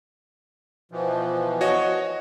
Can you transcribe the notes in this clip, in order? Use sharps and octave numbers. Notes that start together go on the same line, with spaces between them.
B2 E3 F3
F#4 C#5 D#5